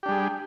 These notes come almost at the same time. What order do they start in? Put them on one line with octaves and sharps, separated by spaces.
G4 D4 G3 G#4